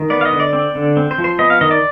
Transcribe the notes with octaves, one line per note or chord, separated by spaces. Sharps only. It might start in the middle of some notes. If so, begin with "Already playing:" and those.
Already playing: D#3
B3 D5
F5
D#5
D3
D5
C4
D3
C4
C5
F3
C5
B3 D#5
F5
D#3 D#5
D5